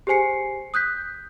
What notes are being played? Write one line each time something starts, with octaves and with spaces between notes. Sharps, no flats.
G4 G#4 C5 G#5 C7 C#7
D#6 F#6 G6 B6